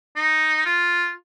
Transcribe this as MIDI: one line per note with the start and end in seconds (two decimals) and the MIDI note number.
0.16 0.66 63
0.66 1.11 65